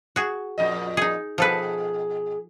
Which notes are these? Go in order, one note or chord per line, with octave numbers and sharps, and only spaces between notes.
F#4 G#4
F2 A#2 D#5
D#4 G#4
B2 F3 G#4 A4 B4